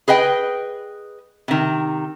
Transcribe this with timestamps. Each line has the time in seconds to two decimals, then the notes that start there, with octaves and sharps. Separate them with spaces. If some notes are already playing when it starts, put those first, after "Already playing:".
0.08 G#4 B4 D#5 G5
1.48 C3 D#3